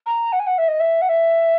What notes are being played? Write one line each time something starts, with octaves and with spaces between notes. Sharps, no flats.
A#5
F#5
G#5
F#5
E5
D#5
E5
F#5
E5